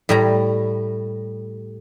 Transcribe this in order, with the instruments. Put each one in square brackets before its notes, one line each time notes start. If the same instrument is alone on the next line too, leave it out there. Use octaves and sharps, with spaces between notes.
[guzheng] A2 G3 A#5